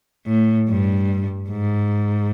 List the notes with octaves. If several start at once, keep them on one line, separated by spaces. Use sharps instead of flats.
A2
G2
G#2